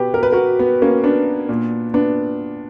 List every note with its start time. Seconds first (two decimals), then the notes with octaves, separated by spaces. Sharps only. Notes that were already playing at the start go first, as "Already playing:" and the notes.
Already playing: B2 G4 B4
0.14 A#4
0.23 B4
0.32 F#4 A#4
0.59 B3
0.82 A#3 C#4
1.04 B3 D4
1.49 A#2
1.94 B3 D4